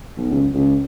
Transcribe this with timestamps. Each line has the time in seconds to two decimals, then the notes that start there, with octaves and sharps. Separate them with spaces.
0.17 B1
0.30 C#2
0.54 C#2